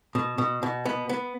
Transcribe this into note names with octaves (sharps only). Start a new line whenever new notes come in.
B2
B2
B2
B3
B3